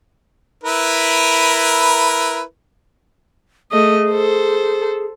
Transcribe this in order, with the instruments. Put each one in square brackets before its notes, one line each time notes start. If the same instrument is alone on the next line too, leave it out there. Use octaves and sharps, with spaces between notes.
[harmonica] E4 A#4 B4
[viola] A3 D#5 [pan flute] G#4
[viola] A4 C5